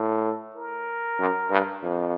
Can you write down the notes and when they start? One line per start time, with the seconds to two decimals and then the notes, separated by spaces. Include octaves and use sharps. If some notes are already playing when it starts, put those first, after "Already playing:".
Already playing: A2 A4
0.56 A#4
1.19 F#2
1.51 G2
1.83 F2